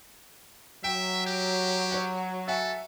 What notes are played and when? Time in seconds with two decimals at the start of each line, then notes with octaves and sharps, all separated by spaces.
0.84 F#3 E5 G5
1.27 G4
1.92 C#5 F#5
2.48 A4 E5 F#5 G#5